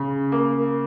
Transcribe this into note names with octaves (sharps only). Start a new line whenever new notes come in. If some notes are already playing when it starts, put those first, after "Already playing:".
Already playing: C#3
A#3